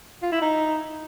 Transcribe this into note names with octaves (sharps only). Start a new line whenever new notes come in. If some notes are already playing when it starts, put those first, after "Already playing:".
F4
E4
D#4